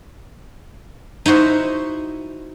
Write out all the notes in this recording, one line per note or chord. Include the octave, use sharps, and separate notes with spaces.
D#4 E4 F#4 C5 E5